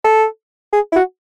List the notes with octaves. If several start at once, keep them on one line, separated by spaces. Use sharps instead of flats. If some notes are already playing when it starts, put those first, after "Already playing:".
A4
G#4
E4
F#4